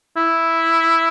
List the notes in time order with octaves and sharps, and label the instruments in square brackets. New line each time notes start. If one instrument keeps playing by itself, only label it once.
[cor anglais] E4